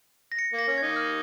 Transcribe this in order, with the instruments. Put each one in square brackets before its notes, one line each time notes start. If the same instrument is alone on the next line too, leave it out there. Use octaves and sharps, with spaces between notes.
[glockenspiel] A#6
C#7
[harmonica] A#3
[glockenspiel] A#6
[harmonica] C#4
[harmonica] A#3 D#4 [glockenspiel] G#6
[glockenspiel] F6